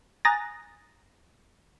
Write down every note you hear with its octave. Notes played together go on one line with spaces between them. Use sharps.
G#5 A#5 D#6 F#6 A6 A#6